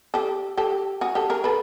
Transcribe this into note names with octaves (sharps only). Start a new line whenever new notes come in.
G4 A4
G4 A4
F#4 G#4
G4 A4
G#4 A#4
A4 B4